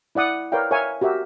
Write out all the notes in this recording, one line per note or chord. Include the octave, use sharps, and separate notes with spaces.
E4 D5 F#5 D#6
A#4 B4 C#5 D5 F5 G5
A#4 C#5 E5 F5 G#5
F#4 G4 A#4 E5